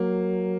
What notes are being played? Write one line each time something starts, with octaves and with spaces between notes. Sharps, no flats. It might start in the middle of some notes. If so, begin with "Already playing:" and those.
Already playing: F#3 A#3